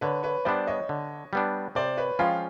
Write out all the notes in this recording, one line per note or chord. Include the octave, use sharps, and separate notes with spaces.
D3 B4 C#5
B4 C#5
G3 B3 D4 C5 D5
C#5 D#5
D3
G3 B3 D4
C3 C5 D5
B4 C#5
F3 G#3 C#4 F4 F5 G5